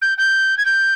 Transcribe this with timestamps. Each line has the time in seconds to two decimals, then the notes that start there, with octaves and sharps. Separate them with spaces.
0.01 G6
0.18 G6
0.57 G#6
0.65 G6